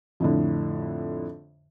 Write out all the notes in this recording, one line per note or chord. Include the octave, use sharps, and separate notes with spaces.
F2 A2 D3